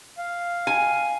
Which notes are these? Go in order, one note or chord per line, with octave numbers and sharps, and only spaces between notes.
F5
G#5